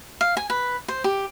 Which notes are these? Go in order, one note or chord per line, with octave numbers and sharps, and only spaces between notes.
F5
G#5
B4
C5
G4